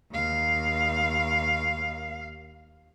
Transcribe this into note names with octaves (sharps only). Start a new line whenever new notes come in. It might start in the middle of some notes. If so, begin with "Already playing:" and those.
D#2 F5